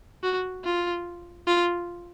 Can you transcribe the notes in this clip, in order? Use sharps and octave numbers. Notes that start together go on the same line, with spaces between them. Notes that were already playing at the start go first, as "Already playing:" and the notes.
F#4
F4
F4